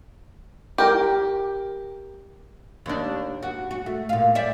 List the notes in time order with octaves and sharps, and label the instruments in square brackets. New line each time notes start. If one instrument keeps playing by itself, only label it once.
[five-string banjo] G4 A#4
[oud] D#2 D4
F#4
F#4
A3
A#2 F5
C5 D5 E5